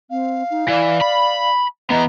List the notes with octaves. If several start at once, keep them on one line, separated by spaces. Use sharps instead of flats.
C4 F5
D#4
E3 D5
B5
E3 B3 D#5 A#5